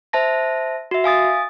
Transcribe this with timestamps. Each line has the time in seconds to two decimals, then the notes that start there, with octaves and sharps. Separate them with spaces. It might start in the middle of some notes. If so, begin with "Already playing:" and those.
0.13 C5 E5 A5 A#6
0.91 F#4 E5
1.04 F5 G#5 D#6 A6